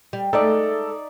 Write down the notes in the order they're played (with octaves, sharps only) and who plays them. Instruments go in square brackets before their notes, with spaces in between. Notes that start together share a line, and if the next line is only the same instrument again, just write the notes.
[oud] G3
[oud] G#3 A3 [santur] D#4 D5 E5 [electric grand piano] A4